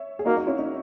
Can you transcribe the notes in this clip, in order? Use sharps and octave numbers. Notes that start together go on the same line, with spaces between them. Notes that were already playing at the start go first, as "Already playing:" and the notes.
Already playing: C#5 E5
G#4
A#3 D#4 F#4
D#4 F#4
C#4 E4
D#4